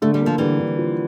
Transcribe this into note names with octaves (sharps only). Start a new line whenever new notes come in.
D3 A3
G3
F3 A#3
D3 E3 G3
D3
F3